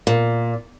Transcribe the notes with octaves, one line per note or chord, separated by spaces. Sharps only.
A#2